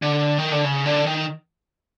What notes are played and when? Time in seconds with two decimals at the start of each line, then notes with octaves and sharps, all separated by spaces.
0.02 D3
0.38 D#3
0.52 D3
0.64 C#3
0.86 D3
1.06 D#3